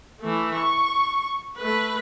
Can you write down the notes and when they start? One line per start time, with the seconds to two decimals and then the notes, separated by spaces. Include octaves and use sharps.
0.21 E3 A3
0.54 C#6
1.57 A3 B4